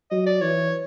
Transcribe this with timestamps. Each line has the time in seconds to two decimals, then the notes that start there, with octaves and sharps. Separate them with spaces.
0.11 F#3 D#5
0.26 D5
0.41 E3 C#5